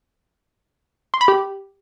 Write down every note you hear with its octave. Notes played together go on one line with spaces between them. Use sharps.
C6
B5
G4